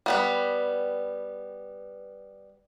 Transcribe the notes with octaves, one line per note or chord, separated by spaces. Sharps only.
G3 B3 B4